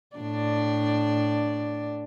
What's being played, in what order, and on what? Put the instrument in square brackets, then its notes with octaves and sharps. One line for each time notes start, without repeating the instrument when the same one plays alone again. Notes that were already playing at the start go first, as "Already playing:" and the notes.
[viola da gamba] A2 D4 D5